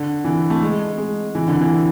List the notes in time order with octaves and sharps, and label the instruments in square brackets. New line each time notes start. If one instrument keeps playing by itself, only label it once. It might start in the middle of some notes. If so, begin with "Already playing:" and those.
Already playing: [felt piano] D3
E3
A3
G#3
G#3
E3
D3
E3